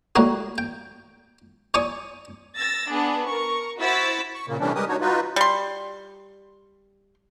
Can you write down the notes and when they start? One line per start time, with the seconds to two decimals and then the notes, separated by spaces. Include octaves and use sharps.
0.16 A2 G3 A3 A#3 F#4
0.58 G5
1.74 C#5 D5 G#5 C#6 D#6
2.56 E6 A6 A#6
2.89 B3 D4 G#4
3.26 A#4 C#6
3.78 E4 F#4 C5 E6 A6 B6
4.34 C#6
4.48 A#2 C#3 A#3
4.60 C3 E3 G3 A3 C#4 D4
4.75 G3 G#3 G4 A#4 B4 D#6
4.88 D4 D#4 F#4 C#5
5.01 D#4 F4 F#4 B4
5.36 G3 C6